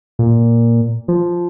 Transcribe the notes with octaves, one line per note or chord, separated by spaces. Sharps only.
A#2
F3